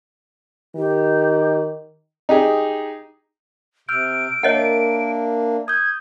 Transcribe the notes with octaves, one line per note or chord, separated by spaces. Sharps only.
D#3 G4
D#4 G4 G#4
C3 E6 F6 G6 D7
A#3 D4 A#4 C#5 D#5 E5 F#5
D#6 G6 G#6